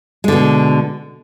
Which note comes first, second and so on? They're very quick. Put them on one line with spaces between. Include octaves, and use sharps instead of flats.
G#3 D3 B2